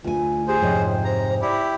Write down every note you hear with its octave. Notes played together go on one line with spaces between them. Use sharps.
D2 F4 G#5
G4 G#4 C5
F2 G#2 C3 C#5
C5 A#5
E4 G4 D5